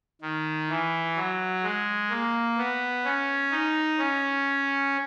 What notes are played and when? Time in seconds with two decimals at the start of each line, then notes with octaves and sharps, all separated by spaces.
0.22 D#3
0.69 E3
1.16 F#3
1.63 G#3
2.10 A#3
2.58 B3
3.05 C#4
3.52 D#4
3.98 C#4